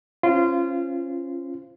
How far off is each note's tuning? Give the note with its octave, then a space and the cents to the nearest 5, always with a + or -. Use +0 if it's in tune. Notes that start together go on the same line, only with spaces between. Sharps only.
C#4 -20 F4 -25 C5 -10